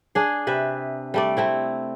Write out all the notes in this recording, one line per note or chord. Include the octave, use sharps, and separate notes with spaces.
D4 G#4
C3 B4 E5
G3 A3 D5
A3 C4 E4